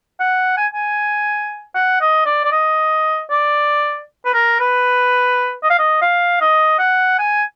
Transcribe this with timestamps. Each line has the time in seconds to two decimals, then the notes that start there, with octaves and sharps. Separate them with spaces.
0.20 F#5
0.57 G#5
0.74 G#5
1.74 F#5
2.01 D#5
2.26 D5
2.45 D5
2.52 D#5
3.30 D5
4.25 B4
4.34 A#4
4.60 B4
5.63 D#5
5.70 F5
5.79 D#5
6.01 F5
6.41 D#5
6.79 F#5
7.19 G#5